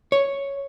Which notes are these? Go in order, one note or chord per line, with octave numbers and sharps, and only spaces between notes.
C#5